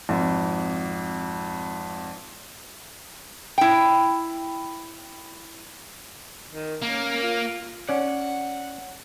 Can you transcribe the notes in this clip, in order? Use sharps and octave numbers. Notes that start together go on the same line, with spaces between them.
G#1 F2
E4 G5
D#3
A#3 C#4
F4
C#4 D5 F#5